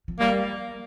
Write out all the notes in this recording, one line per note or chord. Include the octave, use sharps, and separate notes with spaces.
F3
G3 A#3